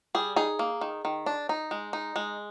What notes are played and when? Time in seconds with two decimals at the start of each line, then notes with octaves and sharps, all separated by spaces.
0.15 G3 G#4
0.36 D#4 G#4
0.59 A#3
0.81 D#3
1.05 D#3
1.26 D4
1.49 D#4
1.71 G#3
1.93 D#4
2.16 G#3